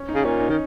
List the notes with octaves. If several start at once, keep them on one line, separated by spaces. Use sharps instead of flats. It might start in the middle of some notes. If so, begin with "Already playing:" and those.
Already playing: C#4
D#4
C#3
A#2 C#4
D#4
D#3